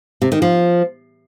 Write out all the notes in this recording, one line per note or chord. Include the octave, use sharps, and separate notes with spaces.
C3
D#3
F3